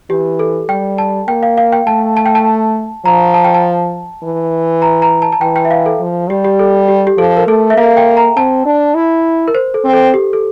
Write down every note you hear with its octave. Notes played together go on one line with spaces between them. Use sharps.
E3 G4
A4
G3 G5
A5
A#3 G5
F5
F5
G5
A3 A5
A5
G5
A5
F3 A#5
A5
G5
A5
E3
A#5
A#5
A5
A5
E3 G5
G5
E5
F5
A4
F3
G3 G4
G4
A4
G4
G4
F3 A4
A#4
A3 A4
E5
A#3 F5
G5
A#5
C4 A5
D4
E4
A#4
C5
A4
C4
A4
G4
A4